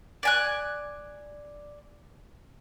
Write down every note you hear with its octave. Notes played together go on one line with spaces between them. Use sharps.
D5 G#5 F#6